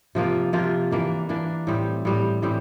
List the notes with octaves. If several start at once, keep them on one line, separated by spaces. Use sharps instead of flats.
C3 F3 A#3 F4
C3 F3 A#3 F4
E3 A#3 D4
E3 A#3 D4
A2 G3 C4
A2 G3 C4
A2 E3 G3 C4